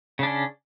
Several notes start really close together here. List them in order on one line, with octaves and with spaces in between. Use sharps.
C#3 D4 C#4